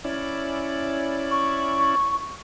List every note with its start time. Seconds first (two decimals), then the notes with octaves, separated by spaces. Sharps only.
0.04 C#4 E4 D5
1.31 C#6